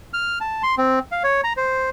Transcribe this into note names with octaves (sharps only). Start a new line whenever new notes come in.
F6
A5
C6
C4
F5
C#5
A#5
C5